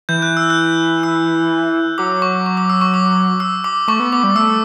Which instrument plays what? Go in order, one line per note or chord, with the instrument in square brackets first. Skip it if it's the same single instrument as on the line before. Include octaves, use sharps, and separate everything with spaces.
[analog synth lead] E3 [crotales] G6
[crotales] F#6
E6
F#6
E6
[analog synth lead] F#3 [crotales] D6
[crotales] C#6
C#6
D6
E6
C#6
D6
E6
D6
[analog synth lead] A3 [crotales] C#6
[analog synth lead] B3
[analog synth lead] B3 [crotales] D6
[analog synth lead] G3
[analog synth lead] A3 [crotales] E6